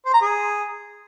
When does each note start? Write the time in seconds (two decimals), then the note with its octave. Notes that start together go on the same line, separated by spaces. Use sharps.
0.06 C5
0.14 A#5
0.21 G#4